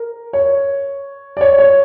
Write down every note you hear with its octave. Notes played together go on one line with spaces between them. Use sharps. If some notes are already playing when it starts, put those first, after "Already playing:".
Already playing: A#4
C#5
D5
C#5
C#5